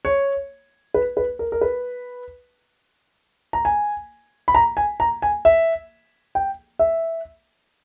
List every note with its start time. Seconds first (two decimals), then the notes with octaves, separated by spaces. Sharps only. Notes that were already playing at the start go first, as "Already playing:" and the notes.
0.05 C#5
0.94 B4
1.17 B4
1.39 A#4
1.52 A#4
1.61 B4
3.53 A#5
3.65 G#5
4.48 B5
4.55 A#5
4.77 G#5
5.00 A#5
5.22 G#5
5.45 E5
6.35 G5
6.79 E5